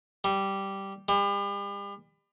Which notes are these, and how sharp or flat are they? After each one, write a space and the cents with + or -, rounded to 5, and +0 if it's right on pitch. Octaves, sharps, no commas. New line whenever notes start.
G3 -5
G3 +40